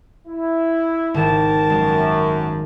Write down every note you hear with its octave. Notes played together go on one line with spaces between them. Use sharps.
E4
G#1 A#4 A5
F#2 G#3